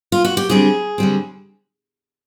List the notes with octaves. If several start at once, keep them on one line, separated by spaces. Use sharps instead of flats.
F4
F#4
G4
D3 G3 C4 G#4
D3 G3 C4